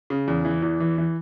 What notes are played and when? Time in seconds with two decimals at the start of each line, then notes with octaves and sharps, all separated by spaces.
0.10 C#3
0.28 E2
0.45 E3
0.62 E2
0.80 E3
0.98 E3